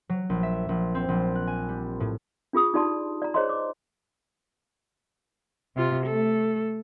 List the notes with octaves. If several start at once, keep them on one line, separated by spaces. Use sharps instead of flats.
F#3
A#1
E5
A#1
C4
A#1
F#6
G#5
G3
A2
D4 F4 G#4 D#6
D#4 F4 G4 D5 A5 C6
D5 A#5
G#4 C5 C#5 D#5 A#5 C6
D6
C3 F4
A3 A4